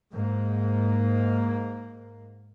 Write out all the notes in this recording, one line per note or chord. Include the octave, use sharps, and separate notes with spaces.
G#2 A#3